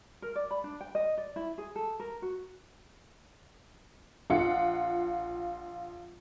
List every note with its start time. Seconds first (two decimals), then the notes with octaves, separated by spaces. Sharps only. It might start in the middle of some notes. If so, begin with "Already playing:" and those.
0.22 A#4
0.35 D5
0.51 B5
0.64 D4
0.81 G5
0.95 D#5
1.18 D5
1.36 E4
1.58 G#4
1.76 A4
2.00 A#4
2.22 F#4
4.30 A#1 F4 F#5 C#7